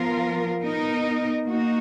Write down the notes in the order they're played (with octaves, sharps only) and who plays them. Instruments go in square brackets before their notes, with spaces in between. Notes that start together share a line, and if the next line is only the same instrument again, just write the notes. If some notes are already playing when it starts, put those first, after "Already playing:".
Already playing: [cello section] F3 B3 F4 A#4
B3 D#4 A#4 D#5
A#3 D#4 F#4